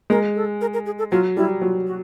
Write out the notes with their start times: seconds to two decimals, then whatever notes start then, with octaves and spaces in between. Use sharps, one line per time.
0.10 G#3 A#4
0.35 A4
0.61 A#4
0.74 A#4
0.86 G#4
0.99 A4
1.11 F#3 F4
1.37 G3 E4
1.61 F#3 F4
1.87 F#4